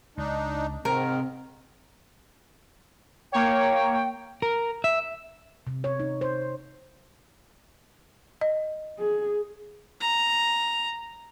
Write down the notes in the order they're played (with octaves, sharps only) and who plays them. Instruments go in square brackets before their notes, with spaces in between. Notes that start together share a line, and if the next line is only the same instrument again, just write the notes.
[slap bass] C#2 [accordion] D4 D#4
[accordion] G#2 D#3 [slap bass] C3 [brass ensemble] C4 [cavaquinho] A#4
[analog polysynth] A#3 C#5 [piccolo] G5
[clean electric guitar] A#4
E5
[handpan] C3
C#5
D#4
C5
[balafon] D#5
[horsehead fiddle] G#4
[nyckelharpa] A#5